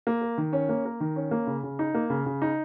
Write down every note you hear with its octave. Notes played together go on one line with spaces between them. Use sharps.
A#3
A#4
D#3
C#4
A#3
A#4
D#3
C#4
A#3
C#3
C#3
D#4
A#3
C#3
C#3
D#4